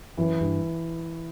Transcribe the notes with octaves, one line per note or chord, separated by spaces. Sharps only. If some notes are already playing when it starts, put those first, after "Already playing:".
F#2 E3
G2